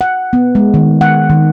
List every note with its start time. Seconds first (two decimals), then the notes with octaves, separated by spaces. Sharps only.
0.01 F#5
0.33 B3
0.55 G#3
0.74 D#3
1.01 F#5
1.30 D#3